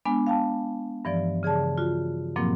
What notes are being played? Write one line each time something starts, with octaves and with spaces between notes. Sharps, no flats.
G#3 B3 D4 G#5
F5 G5 A5
G2 E3 F3 D5
C#3 G#4 D5 A5
F4 F#4
G2 A#2 F3 F#3 A#3 C4